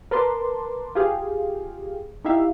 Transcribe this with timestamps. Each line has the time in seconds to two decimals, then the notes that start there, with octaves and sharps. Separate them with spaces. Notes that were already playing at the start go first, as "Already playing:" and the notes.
0.11 A#4 B4 A5 C6 D6
0.95 F4 G4 G#4 F5
2.24 D#4 E4 G4 E5 F5